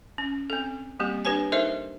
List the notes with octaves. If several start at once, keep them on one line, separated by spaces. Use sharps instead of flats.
C#4
C4 A4
G3 A#3 C4 G4
D4 G4 B4 C#5 G#5
D#4 A4 A#4 C5 D#5 E5